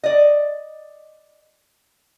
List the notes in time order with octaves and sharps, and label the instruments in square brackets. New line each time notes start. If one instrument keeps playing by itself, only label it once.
[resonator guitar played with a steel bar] D5 D#5